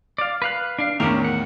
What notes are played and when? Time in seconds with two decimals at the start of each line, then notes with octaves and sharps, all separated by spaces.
0.18 D5 F5
0.42 B4 F5 F#6
0.79 D4 F5
1.00 E2 A2 D#3 C#4 D4 A#4
1.24 F#5